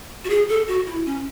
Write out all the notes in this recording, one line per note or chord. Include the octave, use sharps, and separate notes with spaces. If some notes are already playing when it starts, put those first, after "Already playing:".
F#4
G#4
A4
F#4
E4
C#4